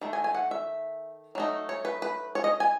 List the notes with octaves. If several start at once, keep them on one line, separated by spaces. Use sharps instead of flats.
D#3 A3
G#5
G#5
F#5
E5
F#3 A3 D#4
C#5
B4
B4
C#5
D#5
G#5